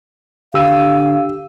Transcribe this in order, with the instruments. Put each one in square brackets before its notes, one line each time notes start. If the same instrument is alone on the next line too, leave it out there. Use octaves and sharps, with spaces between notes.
[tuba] D3 [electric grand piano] G4 E6 D#7 [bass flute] F5